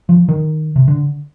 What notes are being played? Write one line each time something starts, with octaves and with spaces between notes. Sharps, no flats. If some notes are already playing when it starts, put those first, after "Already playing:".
F3
D#3
C3
D3